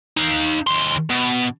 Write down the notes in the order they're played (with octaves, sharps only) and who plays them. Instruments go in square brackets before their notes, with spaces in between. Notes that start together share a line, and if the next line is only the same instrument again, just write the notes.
[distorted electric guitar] D#4 F5
D#2 C6
B2